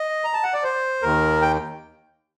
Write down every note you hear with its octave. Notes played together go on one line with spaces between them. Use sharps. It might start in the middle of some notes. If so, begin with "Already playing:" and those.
Already playing: D#5
A#5
A5
F#5
D5
C5
D#2 D#3 A#4
G5